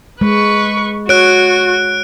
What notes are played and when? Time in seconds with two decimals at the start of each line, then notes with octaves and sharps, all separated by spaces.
0.21 G#3 B4 C#6
1.09 F#4 C#5 F#6 D7